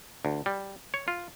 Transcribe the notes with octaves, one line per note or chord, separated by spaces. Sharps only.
D2
G3
C#5
F4